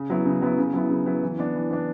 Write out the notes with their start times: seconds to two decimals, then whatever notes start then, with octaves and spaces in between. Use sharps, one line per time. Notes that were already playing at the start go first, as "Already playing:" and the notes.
Already playing: C#3
0.10 F#3 B3 E4
0.25 C#3
0.42 F#3 B3 E4
0.58 C#3
0.73 F#3 B3 E4
0.90 C#3
1.06 F#3 B3 E4
1.22 E3
1.39 B3 D4
1.55 E3
1.71 B3 D4